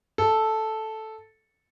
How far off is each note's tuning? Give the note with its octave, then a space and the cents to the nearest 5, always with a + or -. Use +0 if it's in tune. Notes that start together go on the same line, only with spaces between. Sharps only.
A4 -5